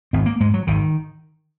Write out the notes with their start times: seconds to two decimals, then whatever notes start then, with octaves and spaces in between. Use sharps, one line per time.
0.13 G#1 C4
0.26 A#3
0.40 G#2 G#3
0.54 F#3
0.67 G#1 D#3